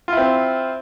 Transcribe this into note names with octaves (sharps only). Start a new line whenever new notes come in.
C4 E4 F4